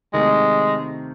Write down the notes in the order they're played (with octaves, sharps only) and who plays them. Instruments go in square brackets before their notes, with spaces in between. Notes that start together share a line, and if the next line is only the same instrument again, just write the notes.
[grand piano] C3 D#3 A3 [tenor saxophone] G#3